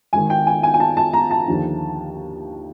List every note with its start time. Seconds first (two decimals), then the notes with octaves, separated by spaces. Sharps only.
0.13 G#1 G#2 D#3 G#5
0.30 G5
0.47 G#5
0.63 G#5
0.74 G#5
0.80 A5
0.97 A5
1.13 A#5
1.31 A5
1.48 D#2 D3 F3